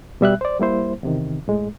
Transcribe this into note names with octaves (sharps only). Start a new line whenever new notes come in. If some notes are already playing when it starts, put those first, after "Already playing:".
B2 G3 E5 F#6
C5 D5
G3 A#3 E4 C5
E2 C3 D#3
A2 G#3